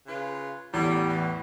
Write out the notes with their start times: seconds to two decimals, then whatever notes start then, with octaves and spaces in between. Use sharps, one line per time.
0.07 C#3 F4 B4
0.74 E2 A2 G3
1.09 E3